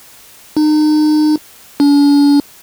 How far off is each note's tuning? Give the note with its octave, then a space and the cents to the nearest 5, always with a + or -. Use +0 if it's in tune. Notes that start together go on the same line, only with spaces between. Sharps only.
D#4 -35
D4 -45